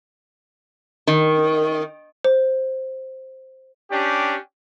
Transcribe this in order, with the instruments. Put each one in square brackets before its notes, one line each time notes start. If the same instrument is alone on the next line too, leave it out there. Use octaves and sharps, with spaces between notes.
[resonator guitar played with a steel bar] D#3
[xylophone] C5
[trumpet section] C#4 D4 G4